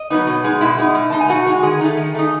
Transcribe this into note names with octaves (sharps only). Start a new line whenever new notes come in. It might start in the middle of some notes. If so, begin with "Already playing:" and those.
Already playing: D#5
F#3 B3 D#4
B2
G#3 D#4
B2 E4 E5
G#3 D#4
B2
G#3 D#4 A5
G#5
B2 F#4 F#5
G#3 D#4
D#3 G#4 G#5
A3 D#4
D#3
A3 D#4